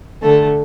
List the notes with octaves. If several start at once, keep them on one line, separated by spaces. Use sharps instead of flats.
D3 A3 A4